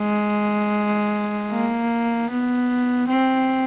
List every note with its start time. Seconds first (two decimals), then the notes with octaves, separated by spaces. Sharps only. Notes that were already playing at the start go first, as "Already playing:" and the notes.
Already playing: G#3
1.51 A#3
2.30 B3
3.08 C4